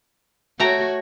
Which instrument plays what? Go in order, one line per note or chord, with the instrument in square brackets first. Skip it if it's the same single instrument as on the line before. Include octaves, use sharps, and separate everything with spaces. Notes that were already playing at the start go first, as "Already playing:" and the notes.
[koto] A3 G5 A#5 [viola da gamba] F#4 C#5